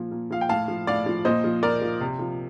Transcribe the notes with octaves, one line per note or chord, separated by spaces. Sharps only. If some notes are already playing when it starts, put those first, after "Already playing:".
Already playing: A#2 F3
A#2
F3 F5
G5
A2 F5 A5
F3
A2 D5 F5
F3
A#2 C5 D#5
F3
A#2 A#4 D5
F3
C3
F3